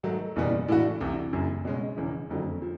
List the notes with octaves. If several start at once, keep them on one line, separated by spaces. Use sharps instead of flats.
G#2 D#3 F#3 A3
F#1 E2 B2 G3 B3
A2 E3 A3 D4 F#4
C2 C3 E3
F#1 F#2 C#3
B2 G#3 C#4
E1 E2 C#3
F#1 F2 D3 F#3
F3